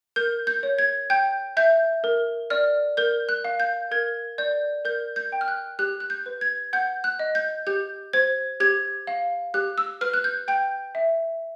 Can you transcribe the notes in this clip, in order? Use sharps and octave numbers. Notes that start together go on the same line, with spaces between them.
A#4 G6
G6
C#5
G#6
G5 G6
E5 G6
A#4
D5 F6
A#4 G6
F#6
F5
G6
A#4 G#6
D5 G6
A#4 G6
G6
G5
F6
F#6
G4 F#6
F#6
G6
B4
G#6
F#5 G6
F#6
D#5
G6
G4 G6
C5 G#6
G4 G#6
F5
G4 F#6
E6
B4 F6
F#6
G6
G5 G6
E5